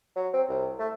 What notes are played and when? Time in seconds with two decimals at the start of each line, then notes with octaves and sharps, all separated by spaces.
0.16 F#3
0.33 C4
0.49 C2
0.79 A3